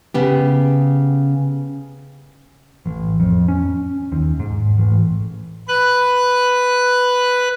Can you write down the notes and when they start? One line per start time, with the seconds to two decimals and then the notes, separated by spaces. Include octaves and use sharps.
0.14 C#3 B3 G4
2.86 A1
3.20 F2
3.48 C#4
4.12 D#2
4.40 G#2
4.78 A1
5.68 B4 F#6